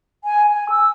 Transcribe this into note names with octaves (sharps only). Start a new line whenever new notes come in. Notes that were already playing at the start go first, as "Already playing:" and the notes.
G#5
G#5
E6